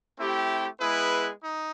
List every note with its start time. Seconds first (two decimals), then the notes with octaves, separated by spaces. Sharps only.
0.18 A3 C4 E4 G4
0.79 G#3 B3 E4 G#4 B4
1.43 D#4